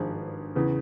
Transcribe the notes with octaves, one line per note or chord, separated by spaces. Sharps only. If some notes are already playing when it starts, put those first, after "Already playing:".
Already playing: G#1 G2 F3 G#4
E2 C#3 E3